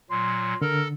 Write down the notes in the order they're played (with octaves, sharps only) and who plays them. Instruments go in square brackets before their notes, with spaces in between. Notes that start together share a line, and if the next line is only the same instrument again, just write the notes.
[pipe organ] A#2 F#3 [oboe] C6
[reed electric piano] D3 [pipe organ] A4 [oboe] A#4